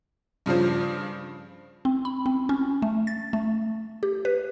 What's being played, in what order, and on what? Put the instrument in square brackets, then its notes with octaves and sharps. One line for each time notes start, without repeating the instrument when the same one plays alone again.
[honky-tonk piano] G2 C#3 F3 C5
[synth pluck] C4
B5
C4
C#4
A3
A6
A3
G4
B4